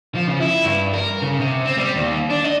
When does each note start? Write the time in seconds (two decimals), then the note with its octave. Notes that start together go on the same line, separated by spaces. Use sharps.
0.15 F3
0.27 C#3
0.40 E4
0.64 G2
0.93 A#4
1.22 C#3
1.40 C3
1.65 C4
1.78 G3
1.96 D#2
2.30 D4
2.44 D#5